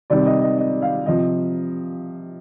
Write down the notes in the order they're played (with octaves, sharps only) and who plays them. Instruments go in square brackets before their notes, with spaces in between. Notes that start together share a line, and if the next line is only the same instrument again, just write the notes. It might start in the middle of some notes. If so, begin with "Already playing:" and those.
[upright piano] C3 D#3 G3 D5
D#5
D#5
D#5
F5
C3 F3 D#5